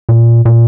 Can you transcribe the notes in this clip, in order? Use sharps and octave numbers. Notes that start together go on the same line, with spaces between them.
A#2
A#2